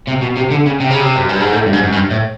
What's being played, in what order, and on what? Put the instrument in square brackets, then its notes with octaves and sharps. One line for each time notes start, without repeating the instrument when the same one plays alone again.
[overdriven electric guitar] C3
B2
C3
D3
C#3
C3
C#3
C3
F#2
G2
G#2
A2
G2
G#2
F#2
G2
A2